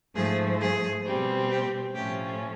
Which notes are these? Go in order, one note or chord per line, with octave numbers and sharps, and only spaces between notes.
G#2 F3 A3 G#4
G#4
B2 G3 C4
G4
A2 F3 A3 C#4 G4